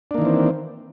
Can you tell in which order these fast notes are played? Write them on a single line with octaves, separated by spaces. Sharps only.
D4 A#3 D#3 E3 C4